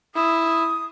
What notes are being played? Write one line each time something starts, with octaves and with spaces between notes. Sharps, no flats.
E4 D#6